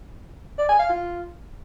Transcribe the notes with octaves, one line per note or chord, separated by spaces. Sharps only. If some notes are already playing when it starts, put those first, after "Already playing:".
D5
G#5
F5
F4